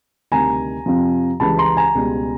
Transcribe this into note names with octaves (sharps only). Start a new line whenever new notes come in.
D2 C3 D#3 G3 G#5 A#5
F2 C3 F3
C#2 C#3 E3 G3 A5 B5
A#5 C6
G#5 A#5
C#2 B2 G3